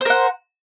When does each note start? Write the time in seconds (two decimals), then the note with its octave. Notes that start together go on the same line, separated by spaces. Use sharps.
0.01 C5
0.05 A#4
0.10 F#5